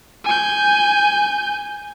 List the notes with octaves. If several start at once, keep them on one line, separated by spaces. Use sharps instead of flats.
G#5 G6